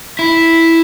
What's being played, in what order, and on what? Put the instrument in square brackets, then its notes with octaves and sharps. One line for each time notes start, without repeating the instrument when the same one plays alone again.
[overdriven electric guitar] E4